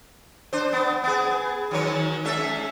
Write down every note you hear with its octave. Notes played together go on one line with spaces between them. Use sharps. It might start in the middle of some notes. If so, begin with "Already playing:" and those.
D4 C5
B3
B3 G#4
D#3 F#3 C#5
G#3 C#4 E5